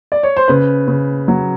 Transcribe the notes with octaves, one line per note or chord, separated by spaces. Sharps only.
D5
C#5
C5
C#3 B4
C#3
F#3